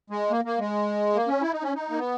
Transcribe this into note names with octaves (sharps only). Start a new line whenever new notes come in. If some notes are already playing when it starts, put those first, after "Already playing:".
G#3
A#3
A#3
G#3
A#3
C#4
E4
D#4
C#4
D#4
A#3
B3